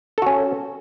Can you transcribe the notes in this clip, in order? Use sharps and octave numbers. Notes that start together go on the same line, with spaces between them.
C#4 F#4 A4